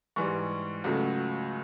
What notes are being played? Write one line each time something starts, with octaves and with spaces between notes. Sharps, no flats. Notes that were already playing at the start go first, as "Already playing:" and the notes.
G#2 E3 G3 C#6
C#2 C#3 F#3 A3